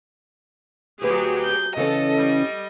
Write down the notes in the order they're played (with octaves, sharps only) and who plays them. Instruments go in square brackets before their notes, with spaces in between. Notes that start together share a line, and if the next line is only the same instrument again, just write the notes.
[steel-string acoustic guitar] D2 B3 B4 [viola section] F#3 G4 G#4
[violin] G6
[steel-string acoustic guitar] C#3 E3 C#4 [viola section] A4 [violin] D#5
[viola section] G3